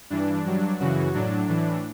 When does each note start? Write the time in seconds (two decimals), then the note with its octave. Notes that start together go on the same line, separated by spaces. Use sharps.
0.10 G2 E3 D4
0.46 G2 F#3
0.80 F#2 C#3 E3 F#4
1.14 A2 F#3 D4
1.49 A2 E3